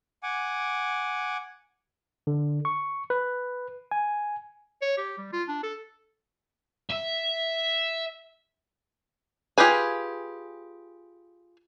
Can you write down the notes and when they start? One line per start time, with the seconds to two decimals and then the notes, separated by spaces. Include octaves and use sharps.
0.23 F#5 G#5 D6
2.27 D3
2.65 C#6
3.10 B4
3.91 G#5
4.82 C#5
4.97 G4
5.18 G3
5.33 F4
5.48 D4
5.63 A4
6.90 E5
9.58 F4 G4 G#4 B4 G#5